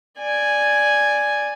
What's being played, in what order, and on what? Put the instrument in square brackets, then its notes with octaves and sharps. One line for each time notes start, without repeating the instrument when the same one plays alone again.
[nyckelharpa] D5 G#5